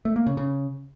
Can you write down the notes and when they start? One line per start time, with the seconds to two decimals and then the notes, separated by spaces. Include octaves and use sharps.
0.05 A3
0.16 A#3
0.27 C#3
0.37 C#3